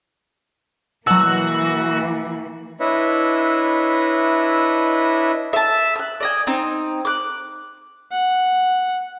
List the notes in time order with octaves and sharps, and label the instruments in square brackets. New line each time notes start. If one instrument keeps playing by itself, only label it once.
[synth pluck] B2 F#3 [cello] E3 A#3 [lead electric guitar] F#4 F#5 [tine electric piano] E6
[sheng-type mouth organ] D4 E4 B4 C#5 D#5 E5
[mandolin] E5 A5
E6 F#6
D5 D#5 G#5
C4 D#4
D6 F#6
[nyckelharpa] F#5